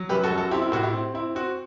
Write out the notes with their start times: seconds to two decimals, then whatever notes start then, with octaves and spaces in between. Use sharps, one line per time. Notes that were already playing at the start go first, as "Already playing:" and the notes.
Already playing: F#3
0.09 F#2 G4 B4
0.24 F#4 A4
0.31 F#2
0.38 F#4 A4
0.51 C4 E4 G4
0.62 E4
0.72 A2 F#4
0.83 E4 G4
0.93 C4
1.14 C4 E4
1.35 C4 F#4